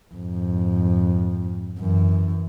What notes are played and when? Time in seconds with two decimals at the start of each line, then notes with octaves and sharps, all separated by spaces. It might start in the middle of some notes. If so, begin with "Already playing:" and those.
0.14 F2 G#2
1.80 F#2 E3